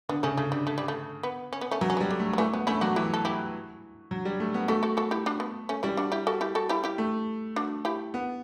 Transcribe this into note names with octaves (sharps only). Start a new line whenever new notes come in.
D3 B3
C#3 A3 C#4
C#3 A3
D3 G3
A3
G3
A3
B3
C#4
B3
A3 C#4
F#3 B3
C#4
G3 B3
D3
A3
F#3
E3 A3
F#3 B3
A3 C#4 E4
F#3 D4 F#4
E3 E4 G4
A4
E4 G4
F#3
G3
A3
B3
A3 F#4 A4
F#4 A4
F#4 A4
E4 G4
D4 F#4
B3
A3 C#4
G3 C#4 E4
D4 F#4
E4 G4
F#4 A4
E4 G4
F#4 A4
E4 G4
E4 G4
A3
D4 F#4
E4 G4
B3